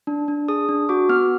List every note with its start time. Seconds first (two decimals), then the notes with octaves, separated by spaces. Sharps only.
0.07 D4
0.28 D4
0.48 G#4 D#6
0.69 D4
0.89 F#4 D6
1.09 B3 F6